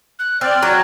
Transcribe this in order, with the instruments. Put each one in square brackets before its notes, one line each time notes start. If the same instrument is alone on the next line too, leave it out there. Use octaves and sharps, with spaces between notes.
[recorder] F#6
[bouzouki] C4 [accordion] D5 [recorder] F6
[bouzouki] F#3 [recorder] F#6